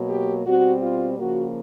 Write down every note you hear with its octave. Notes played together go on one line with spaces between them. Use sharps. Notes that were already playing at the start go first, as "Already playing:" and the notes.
Already playing: B2 F#3 A#3
G4
B2 G3 C4 F#4
F4
C#3 F3 A#3 F#4